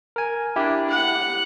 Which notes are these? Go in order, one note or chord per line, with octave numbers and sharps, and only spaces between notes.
A#4 G#5
D4 E4 G4
F#5